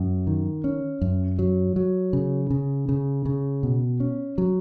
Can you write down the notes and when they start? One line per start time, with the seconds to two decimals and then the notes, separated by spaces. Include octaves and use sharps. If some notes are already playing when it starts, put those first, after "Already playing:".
Already playing: F#2
0.27 D#3
0.64 C#4
1.01 F#2
1.39 F#3
1.76 F#3
2.13 C#3
2.50 C#3
2.89 C#3
3.26 C#3
3.63 B2
4.00 C#4
4.38 F#3